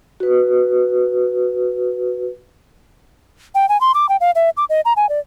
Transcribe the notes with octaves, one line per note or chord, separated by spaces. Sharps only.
F#4 B4
G5
G#5
C6
D6
G5
F5
E5
D6
D#5
A#5
G#5
D5